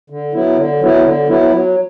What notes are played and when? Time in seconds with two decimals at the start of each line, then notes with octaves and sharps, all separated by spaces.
0.10 D3
0.33 F#3 B3 E4
0.57 D3
0.81 F#3 B3 E4
1.05 D3
1.28 F#3 B3 E4
1.52 F#3